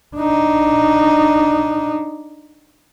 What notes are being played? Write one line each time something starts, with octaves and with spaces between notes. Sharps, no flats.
D4 D#4